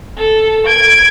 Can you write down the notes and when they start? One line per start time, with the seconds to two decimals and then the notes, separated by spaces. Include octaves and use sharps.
0.17 A4
0.67 G#6 D7